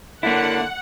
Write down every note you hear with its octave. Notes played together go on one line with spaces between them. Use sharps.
D3 A#3 E4 F#5